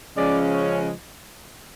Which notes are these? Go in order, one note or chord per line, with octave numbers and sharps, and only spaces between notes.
C#3 F3 G#3 C#4 D5
C#5